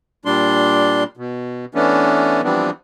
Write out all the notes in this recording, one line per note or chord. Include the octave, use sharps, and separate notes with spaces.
A#2 G3 D4 C6
B2
E3 A3 B3 C#4 D4
E3 F3 G3 B3 C4 D4